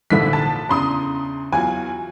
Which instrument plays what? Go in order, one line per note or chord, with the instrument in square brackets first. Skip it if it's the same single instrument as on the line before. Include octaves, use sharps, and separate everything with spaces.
[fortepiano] A#1 G#2 E5 [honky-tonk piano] D3 E3 B6
[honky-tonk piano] A5
[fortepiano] E2 C#3 D4 [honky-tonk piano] A#5 C6 D#6
[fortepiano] E2 F#3 F4 [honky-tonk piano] G#5